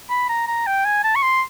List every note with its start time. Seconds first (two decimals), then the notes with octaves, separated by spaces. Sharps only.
0.10 B5
0.29 A#5
0.47 A#5
0.67 G5
0.85 G#5
1.04 A5
1.15 C#6
1.22 C6